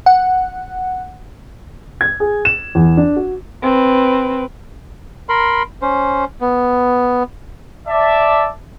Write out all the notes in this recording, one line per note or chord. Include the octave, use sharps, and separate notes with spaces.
F#5
G#6
G#4
E7
E2
D4
F#4
C4 B4
A#4 B5 C6
C#4 C5
B3
D5 E5 A5